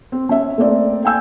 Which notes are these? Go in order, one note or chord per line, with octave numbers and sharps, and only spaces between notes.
C4
C#4 E5
A3 A#3 C4 D5
G5 G#5 E6 G6